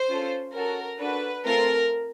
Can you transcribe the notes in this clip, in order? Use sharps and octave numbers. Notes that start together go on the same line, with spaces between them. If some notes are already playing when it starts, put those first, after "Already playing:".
Already playing: C5
C#4 F4 A4
C#4 F#4 A4 A#4
D4 F#4 A4 B4
A3 C4 F4 A4 A#4